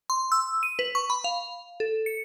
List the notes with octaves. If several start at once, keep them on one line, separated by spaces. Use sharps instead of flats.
C6
E6
D#7
B4
C#6
B5
F5
A4
C#7